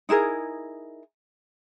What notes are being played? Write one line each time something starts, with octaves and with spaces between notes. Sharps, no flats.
D#4 E4 G#4 A#4